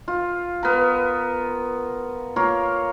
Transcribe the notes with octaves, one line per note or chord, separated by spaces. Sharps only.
F4
B3 A#4
A#3 F4 A#4 C#5